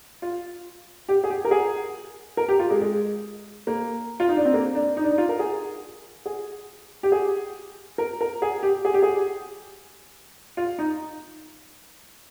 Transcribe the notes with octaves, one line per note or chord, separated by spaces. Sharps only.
F4
G4
G#4
G4
A#4
G#4
A#4
G4
F4
G#3
G#3
A#3
F4
D#4
D4
C4
A#3
D4
D#4
D4
D#4
F4
A#4
G#4
G#4
G4
G#4
A#4
A#4
G#4
G4
G#4
G4
G#4
F4
D#4